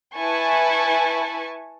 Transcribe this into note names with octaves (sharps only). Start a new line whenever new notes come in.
E4 B4 G#5 A5 C#6